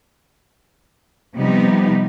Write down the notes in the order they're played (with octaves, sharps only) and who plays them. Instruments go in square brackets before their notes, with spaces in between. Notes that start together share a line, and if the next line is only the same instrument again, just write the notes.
[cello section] C3 F3 G3 B3 D#4 G4